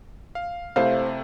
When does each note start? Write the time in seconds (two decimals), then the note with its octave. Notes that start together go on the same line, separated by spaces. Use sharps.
0.35 F5
0.76 C3 A3 E4 C5 F5